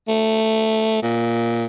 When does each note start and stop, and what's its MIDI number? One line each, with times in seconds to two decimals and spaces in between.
0.08 1.00 57
1.02 1.66 46